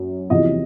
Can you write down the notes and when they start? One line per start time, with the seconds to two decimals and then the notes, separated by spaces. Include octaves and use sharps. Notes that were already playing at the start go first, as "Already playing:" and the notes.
Already playing: F#2
0.30 E2 C3 F3 D#5